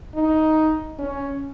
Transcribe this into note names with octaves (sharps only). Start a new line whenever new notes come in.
D#4
C#4